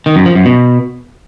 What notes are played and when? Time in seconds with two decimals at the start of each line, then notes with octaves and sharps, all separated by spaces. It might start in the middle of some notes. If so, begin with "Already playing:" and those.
0.06 D#3
0.16 F#2
0.26 F3
0.35 F#2
0.45 B2